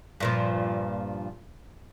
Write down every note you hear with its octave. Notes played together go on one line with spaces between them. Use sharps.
G2 A#2 F3